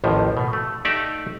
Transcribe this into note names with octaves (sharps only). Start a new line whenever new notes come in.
A1 D#2 A2 F3
B2
A3
A3 D#4 G4 D5 E5 F5